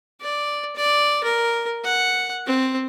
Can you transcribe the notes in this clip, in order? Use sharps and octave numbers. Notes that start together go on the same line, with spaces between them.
D5
D5
A#4
F#5
C4